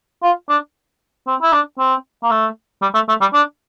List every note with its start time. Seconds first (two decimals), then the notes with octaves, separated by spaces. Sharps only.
0.23 F4
0.49 D4
1.27 C4
1.42 E4
1.53 D4
1.79 C4
2.24 A#3
2.31 A3
2.82 G3
2.95 A3
3.09 A3
3.21 G3
3.34 D4